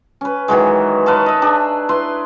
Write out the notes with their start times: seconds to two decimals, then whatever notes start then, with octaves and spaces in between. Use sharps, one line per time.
0.21 C#4 B4
0.48 D#3 E3 F#3 G#3
1.06 B4 F5 A5 C#6
1.26 D#5 E5
1.42 D4 G#4
1.89 E4 B4 C6